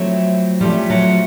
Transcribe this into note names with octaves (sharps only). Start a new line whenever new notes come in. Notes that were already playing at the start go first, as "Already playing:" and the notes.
Already playing: F3 F#3 A3 C4 E4
F3 G3 A3 C#4
F#3